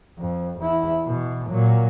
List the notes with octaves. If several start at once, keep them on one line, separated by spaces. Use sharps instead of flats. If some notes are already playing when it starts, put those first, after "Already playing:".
F2
E2 E4
B2 E3
A#2 F#3